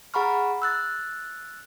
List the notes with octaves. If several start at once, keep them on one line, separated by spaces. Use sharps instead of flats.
G#4 F#5 A#5 B5 C#6 F6
E6 F#6 A6